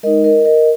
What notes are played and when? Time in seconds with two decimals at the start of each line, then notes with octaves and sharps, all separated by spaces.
0.03 G#3 D#4 A#4 D#5
0.24 A#4 D#5
0.45 A#4 D#5